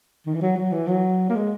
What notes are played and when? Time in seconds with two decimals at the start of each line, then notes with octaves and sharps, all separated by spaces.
0.27 D#3
0.34 E3
0.42 F#3
0.57 F#3
0.72 E3
0.88 F#3
1.30 A#3
1.36 G#3